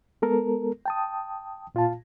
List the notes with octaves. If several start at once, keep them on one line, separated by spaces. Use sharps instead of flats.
G#3 B3 A4 A#4
G5 A5 D#6
A#2 F4 F5 A5